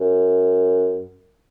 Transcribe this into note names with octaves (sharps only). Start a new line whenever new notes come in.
F#2